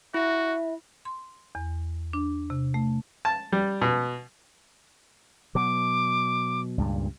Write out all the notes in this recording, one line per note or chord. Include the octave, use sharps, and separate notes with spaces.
E4 F#4 E5
C6
E2
D4
C3
A3
A5
G3
B2
B2 F#3 D6
C#2 G2 A#2